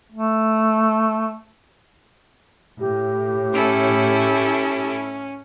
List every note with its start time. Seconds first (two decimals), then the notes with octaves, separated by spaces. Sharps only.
0.12 A3
2.80 A2 G4
3.54 C#4 E4 A4